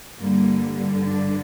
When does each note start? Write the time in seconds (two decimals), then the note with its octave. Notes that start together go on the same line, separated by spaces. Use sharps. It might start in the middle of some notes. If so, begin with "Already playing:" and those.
0.18 G2 D3 G3 A#3
0.77 G3
1.07 D4